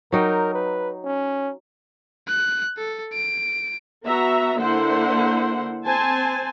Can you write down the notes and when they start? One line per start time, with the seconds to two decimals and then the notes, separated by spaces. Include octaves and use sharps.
0.12 F#3 D#4 A#4 G5
0.54 B4
1.04 C#4
2.28 F#6
2.77 A4
3.13 D7
4.05 B3 F#4 E5 A#5
4.58 D3 A#3 E4 C5 F#5
5.84 C4 C5 G#5 A5